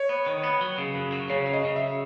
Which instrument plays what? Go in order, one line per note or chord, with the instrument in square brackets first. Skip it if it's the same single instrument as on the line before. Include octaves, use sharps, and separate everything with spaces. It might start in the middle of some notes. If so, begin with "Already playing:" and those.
Already playing: [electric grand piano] C#5
[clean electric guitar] B3
D#3
B3
F#3
C#3
F#2
F#3
[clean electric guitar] C#3 [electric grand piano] C#5
[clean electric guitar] F#3
[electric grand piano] D#5
[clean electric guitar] C#3
[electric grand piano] E5